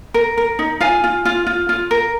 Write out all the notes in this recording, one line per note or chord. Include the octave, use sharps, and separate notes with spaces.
A#4
A#4
D#4
F4 F5 G#5
F4
F4
F4
F4
A#4